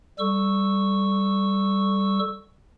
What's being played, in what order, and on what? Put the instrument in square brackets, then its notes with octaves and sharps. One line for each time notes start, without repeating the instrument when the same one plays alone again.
[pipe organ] G3 A4 C#6 E6